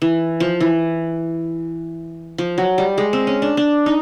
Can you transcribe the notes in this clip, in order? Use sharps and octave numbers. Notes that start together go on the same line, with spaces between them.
E3
F3
E3
F3
F#3
G3
G#3
C4
C#4
D4
D4
D#4